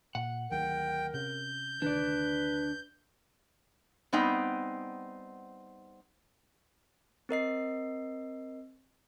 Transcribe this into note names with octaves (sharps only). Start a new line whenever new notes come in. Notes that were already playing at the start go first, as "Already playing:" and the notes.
A#2 F#5
D2 D#3 F#3 A#4 G5
C3 C#4 G6
D2 C3 D#3 D4 B4 D5
G3 B3 C4 D#4 G5
C4 A#4 D#5 C7